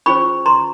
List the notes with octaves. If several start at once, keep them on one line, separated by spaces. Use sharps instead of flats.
C#4 F4 G#4 C5 B5 C#6
A#5 C6